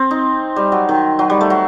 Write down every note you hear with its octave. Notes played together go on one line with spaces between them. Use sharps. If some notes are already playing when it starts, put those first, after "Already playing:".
Already playing: C4
D#4
G3
F#3
D#3
F#3
G3
A3
F#3